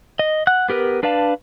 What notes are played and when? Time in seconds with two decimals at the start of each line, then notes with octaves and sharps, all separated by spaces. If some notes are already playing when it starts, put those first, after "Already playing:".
0.19 D#5
0.47 F#5 F#6
0.69 B3 G4 A#4 B4
1.03 D4 B4 D5 F5 A5